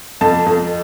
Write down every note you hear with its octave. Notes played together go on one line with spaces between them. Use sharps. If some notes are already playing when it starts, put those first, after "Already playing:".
F2 A5
F2